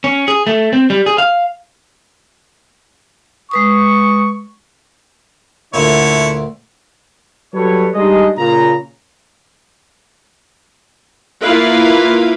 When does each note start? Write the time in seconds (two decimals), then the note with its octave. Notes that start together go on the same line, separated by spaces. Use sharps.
0.04 C#4
0.28 G#4
0.47 A3
0.73 C4
0.90 G3
1.06 G#4
1.18 F5
3.51 G#3 B4 C#6 D#6
5.74 D2 A#2 D3 E4 C#5
7.54 F#3 G3 A4 B4 C#5
7.95 G3 G#3 D4 D#4 G#4 D#5
8.38 A#2 C#3 A#5
11.41 A#3 E4 F4 B4 F5